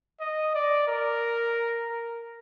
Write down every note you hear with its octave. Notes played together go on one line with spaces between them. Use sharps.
D#5
D5
A#4
A#4